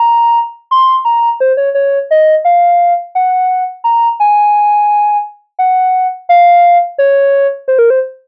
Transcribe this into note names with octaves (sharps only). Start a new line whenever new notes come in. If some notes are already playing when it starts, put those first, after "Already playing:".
Already playing: A#5
C6
A#5
C5
C#5
C#5
D#5
F5
F#5
A#5
G#5
F#5
F5
C#5
C5
A#4
C5